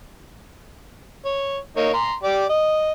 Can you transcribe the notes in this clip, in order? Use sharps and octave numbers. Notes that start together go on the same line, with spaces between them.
C#5
A#3 D#4 C#5
A#5 C6
G4 D5
D#5